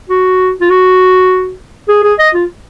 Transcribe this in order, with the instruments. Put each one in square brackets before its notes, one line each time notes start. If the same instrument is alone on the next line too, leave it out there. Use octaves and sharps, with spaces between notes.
[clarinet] F#4
F4
F#4
G#4
G#4
D#5
F4